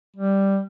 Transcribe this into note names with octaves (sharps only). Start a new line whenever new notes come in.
G3